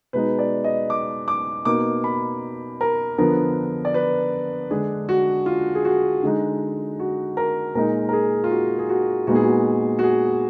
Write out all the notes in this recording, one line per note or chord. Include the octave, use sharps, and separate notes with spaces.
B2 G#3 D#4 B4
D5
D#5
D6
D6
B2 A#3 D#4 D6
B5
A#4
D3 F3 B3 D4 A#4
D5
B4
D3 G#3 D4 G#4
F#4
F4
G#4
F#4
D3 G#3 D#4
F#4
A#4
A#2 G#3 D#4 A#4
A#4
G#4
F4
F#4
G#4
F#4
A#2 G#3 B3 D#4 F#4
G#4
F#4
F#4
G#4